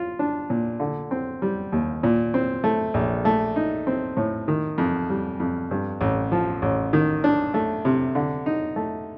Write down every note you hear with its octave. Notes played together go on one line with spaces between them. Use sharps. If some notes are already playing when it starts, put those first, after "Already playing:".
Already playing: F4
D4
A#2
D3
C4
G3
D#2
A#2
C4
A3
A#1
A3
D#4
C4
A2
D#3
F2
G3
F2
G2
A1
F3
A1
D#3
D4
A3
C3
D3
D#4
A3